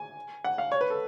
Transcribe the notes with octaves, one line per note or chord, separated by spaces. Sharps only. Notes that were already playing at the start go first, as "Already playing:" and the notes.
Already playing: G#5
F#5
F5
C#5
B4
A4